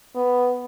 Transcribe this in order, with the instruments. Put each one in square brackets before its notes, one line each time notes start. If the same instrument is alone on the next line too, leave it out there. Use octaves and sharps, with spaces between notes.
[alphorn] B3